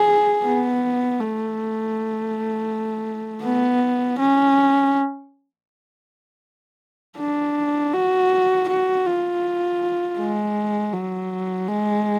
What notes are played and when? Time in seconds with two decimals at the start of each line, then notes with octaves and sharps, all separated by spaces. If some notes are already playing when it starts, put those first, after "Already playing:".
Already playing: G#4
0.45 B3
1.20 A3
3.43 B3
4.19 C#4
7.19 D4
7.93 F#4
8.68 F#4
9.06 F4
10.19 G#3
10.93 F#3
11.68 G#3